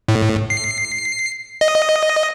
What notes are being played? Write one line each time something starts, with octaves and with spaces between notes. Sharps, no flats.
A2
C7
D#5